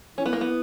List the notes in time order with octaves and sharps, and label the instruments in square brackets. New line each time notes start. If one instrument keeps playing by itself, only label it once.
[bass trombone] E3 [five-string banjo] C#4
[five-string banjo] B3
A#3
B3